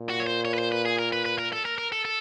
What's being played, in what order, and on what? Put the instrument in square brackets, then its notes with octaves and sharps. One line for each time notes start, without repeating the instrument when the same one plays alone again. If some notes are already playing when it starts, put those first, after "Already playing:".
Already playing: [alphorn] A#2
[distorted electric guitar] F#4
C#5
C5
C#5
B4
C5
B4
G#4
A#4
B4
B4
A#4
A4
A#4
A#4
A4
A4